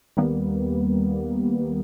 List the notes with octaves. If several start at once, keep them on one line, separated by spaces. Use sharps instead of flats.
D#2 G3 A#3 B3